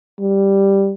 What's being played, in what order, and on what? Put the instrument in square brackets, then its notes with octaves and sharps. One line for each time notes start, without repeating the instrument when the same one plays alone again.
[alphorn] G3